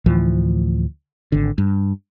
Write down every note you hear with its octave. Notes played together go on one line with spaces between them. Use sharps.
D2 A2 E3 F3
G#1 D3
G2